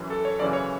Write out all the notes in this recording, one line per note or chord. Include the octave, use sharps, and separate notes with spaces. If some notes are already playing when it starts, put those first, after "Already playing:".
Already playing: F#2 E3
A4
C#5
F#2 C#3 E3 D5
C#5